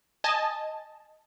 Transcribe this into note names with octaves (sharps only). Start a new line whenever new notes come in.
D#5 G#5 A5